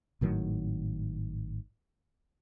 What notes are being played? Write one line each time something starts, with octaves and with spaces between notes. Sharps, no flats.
G#1 A2 D#3 F#3